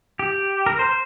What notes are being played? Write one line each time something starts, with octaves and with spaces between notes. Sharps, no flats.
G4
A#4
C5